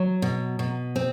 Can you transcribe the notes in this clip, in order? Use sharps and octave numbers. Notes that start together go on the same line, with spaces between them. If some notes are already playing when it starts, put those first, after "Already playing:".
Already playing: F#3
B2
B2
C4